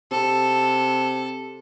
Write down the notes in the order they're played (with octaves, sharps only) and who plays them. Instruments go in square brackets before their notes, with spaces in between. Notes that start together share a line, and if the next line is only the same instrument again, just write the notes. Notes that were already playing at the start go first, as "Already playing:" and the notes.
[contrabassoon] C3 [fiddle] A4